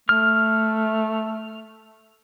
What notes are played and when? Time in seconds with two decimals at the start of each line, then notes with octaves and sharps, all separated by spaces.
0.09 A3 F6